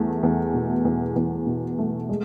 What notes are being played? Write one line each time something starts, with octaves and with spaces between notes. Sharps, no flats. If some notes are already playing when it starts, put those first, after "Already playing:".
Already playing: E2 A3
E2
B2
E2
E2
B2
A3
G#3